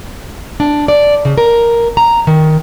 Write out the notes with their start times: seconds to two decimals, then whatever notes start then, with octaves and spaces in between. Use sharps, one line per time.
0.60 D4
0.88 D5
1.25 C#3
1.38 A#4
1.97 A#5
2.27 D#3